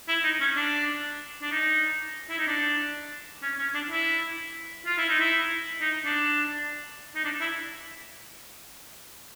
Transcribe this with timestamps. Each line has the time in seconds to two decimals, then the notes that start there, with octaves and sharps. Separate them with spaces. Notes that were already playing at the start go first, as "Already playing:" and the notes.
0.08 E4
0.24 D#4
0.40 C#4
0.56 D4
1.42 D4
1.51 D#4
2.30 E4
2.38 D#4
2.47 D4
3.42 C#4
3.59 C#4
3.74 D4
3.90 E4
4.86 F4
4.98 E4
5.09 D#4
5.20 E4
5.81 D#4
6.05 D4
7.15 D#4
7.24 D4
7.40 E4